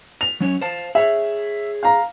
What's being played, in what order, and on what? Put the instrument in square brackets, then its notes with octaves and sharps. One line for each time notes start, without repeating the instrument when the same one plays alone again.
[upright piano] F7
[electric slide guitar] F#3 C#4 C#5
C5 F5 A5
[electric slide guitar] G#4 C#5 [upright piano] E5
[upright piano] F5 A#5